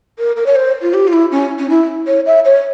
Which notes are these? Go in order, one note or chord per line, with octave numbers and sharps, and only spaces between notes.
A#4
A#4
C#5
C5
F4
G4
F4
E4
C#4
C#4
E4
C#5
E5
C#5